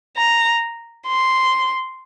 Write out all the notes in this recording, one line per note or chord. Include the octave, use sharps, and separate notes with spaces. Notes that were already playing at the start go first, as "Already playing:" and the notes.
A#5
C6